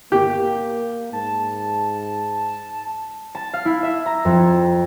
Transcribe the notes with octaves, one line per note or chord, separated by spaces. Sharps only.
A#3 G4
G#2 A5
A5
F5
E4
E5
A#5
F2